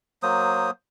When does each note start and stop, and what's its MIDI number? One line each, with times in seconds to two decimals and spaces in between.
0.23 0.71 54
0.23 0.71 58
0.23 0.71 72
0.23 0.71 87